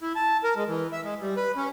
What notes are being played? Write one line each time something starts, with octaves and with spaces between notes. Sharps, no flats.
E4
A5
A#4
G#3
E3
E5
G#3
G3
B4
C#4